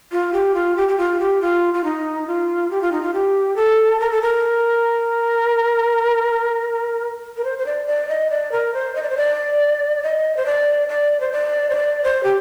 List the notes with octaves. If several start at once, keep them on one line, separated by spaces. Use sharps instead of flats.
F4
G4
F4
G4
G4
F4
G4
F4
F4
D#4
F4
G4
F4
D#4
F4
G4
A4
A#4
A4
A#4
A#4
C5
C5
D5
D5
D#5
D5
A#4
C5
D#5
D5
C5
D5
D#5
C5
D5
D5
C5
D5
C5
D5
C5
G4